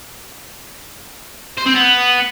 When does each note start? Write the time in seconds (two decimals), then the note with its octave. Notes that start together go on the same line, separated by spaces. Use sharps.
1.57 C5
1.66 C4
1.74 B3